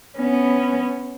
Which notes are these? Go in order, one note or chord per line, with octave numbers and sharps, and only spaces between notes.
B3 C#4